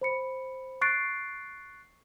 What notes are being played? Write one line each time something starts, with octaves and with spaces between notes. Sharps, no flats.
C5 B5 C#7
C#6 F#6 A6 C7 D7